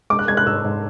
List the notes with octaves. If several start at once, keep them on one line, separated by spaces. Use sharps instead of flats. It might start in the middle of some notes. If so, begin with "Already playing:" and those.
G#3 D6
F#6
G#3 G#6
F#6
G#2 E6
G#2